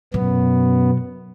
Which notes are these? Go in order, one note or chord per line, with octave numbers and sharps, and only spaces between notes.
F#2 B2 B3